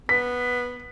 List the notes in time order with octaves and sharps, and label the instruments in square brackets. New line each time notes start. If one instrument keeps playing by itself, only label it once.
[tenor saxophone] B3 [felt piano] B6